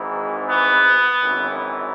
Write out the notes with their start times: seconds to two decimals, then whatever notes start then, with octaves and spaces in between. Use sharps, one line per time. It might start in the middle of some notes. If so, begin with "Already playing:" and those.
Already playing: G#1 G#2 E3
0.49 B3
1.23 G#1 F#2 E3